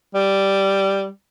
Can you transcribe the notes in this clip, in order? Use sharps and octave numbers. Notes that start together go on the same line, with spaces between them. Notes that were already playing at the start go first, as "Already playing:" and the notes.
G3